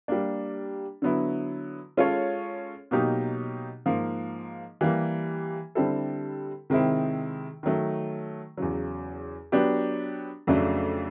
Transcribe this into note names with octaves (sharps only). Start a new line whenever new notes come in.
G3 A#3 D4
D3 F#3 B3 E4
G#3 C#4 F4 A4 C#5
B2 F#3 A#3 D#4 G4
G#2 F3 A#3
E3 G3 A#3
D3 G3 C4 E4 A4
C3 D#3 G#3 C4 E4
D#3 F#3 A3
E2 C#3 F#3
F#3 B3 D4 G4
F2 C#3 F#3 A3 D4